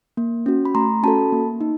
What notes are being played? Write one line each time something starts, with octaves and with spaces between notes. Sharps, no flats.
A#3
C#4 F#4
B5
A3 A#5 C6
C#4 F#4 A4 A5 B5
A#3
D#4